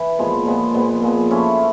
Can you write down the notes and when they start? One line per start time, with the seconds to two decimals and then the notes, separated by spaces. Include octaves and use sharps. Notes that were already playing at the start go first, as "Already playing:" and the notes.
Already playing: E3
0.19 A#2 F3 G#3 B3
0.46 A#2 F3 G#3 B3
0.74 A#2 F3 G#3 B3
1.02 A#2 F3 G#3 B3
1.30 F3 A3 C#4 E4